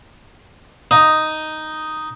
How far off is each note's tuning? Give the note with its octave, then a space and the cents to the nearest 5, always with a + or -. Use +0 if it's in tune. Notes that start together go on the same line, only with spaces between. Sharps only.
D#4 +0 D#5 +0